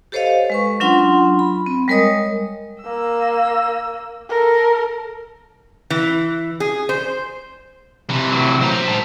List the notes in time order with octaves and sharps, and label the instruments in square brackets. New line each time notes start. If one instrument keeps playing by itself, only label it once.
[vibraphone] G4 A4 C5 C#5 D#5 F5
G#3 B4 C#6
F#3 C#4 D4 F4 F#5 C6
B5
C4
G3 G#3 A#4 C#5 D#5 D#6
[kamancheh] A#3 E6
A4 A#4
[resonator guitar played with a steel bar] E3
G#4
C5
[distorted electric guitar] C3 E3
[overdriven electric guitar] A2 F#3
[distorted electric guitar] C5 A#5
[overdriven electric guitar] G#2 A5